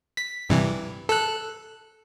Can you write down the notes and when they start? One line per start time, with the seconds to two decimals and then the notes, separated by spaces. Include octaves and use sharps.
0.17 B6
0.49 G2 C3 E3
1.09 A4 F#6